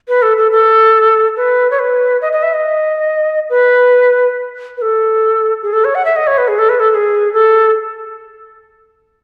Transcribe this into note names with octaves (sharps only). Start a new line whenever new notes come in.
B4
A4
A4
A4
B4
C#5
B4
D#5
D#5
E5
D#5
B4
B4
A4
G#4
A4
C#5
F#5
E5
D#5
C#5
B4
G#4
A4
B4
A4
A4
G#4
A4